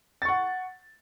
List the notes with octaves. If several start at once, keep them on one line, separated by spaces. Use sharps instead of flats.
F#5 C#6 A6